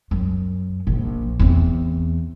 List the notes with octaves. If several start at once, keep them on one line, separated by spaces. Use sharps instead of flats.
F#2
A#1
E2 C4